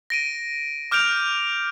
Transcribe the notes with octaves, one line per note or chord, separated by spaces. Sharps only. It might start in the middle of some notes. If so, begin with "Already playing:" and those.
A#6 D7 D#7
D6 F6 G6 D7 F7